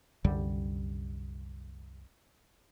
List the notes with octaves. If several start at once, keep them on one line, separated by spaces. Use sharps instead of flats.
C2 F#2 D3 G3